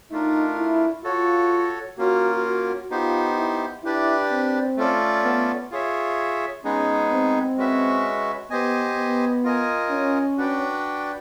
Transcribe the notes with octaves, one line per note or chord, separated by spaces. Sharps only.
A3 D4 D#4 F4 A#4
E4
F4 F#4 A4 C#5
A#3 C#4 F4 F#4 A#4
F#4
B3 D#4 F4 G4 C5
E4
D4 E4 G4 B4 D5
C4
A3 C#4 F4 A4 D5
B3
F4 G#4 C#5 E5
G#3 B3 C#4 D#4 G#4
C4
G#3 C#4 F#4 B4 E5
B3 G4 C5 D#5 G#5
B3
F4 A#4 D#5 G#5
C#4
D4 F#4 B4 D5 G5